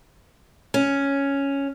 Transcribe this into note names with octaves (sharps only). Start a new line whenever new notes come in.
C#4